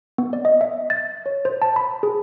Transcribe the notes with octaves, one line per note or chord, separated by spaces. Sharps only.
B3
D5
D#5
E5
A6
C#5
C5
A5
B5
G#4